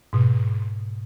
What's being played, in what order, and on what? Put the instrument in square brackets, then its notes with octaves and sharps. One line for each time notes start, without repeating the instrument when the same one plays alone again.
[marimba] G#2 B2